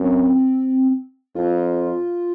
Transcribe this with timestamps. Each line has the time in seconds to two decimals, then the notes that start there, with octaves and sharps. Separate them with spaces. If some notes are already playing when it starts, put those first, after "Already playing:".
Already playing: F#2 C4
1.35 F2 F4